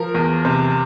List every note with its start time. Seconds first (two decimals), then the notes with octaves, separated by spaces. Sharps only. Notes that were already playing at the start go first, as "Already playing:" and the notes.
Already playing: F3 A#4
0.15 E2
0.45 C3